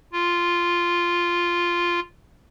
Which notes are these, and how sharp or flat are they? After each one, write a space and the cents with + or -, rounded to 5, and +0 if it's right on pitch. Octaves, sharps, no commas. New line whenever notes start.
F4 -5